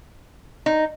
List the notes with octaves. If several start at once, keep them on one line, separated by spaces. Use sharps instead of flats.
D#4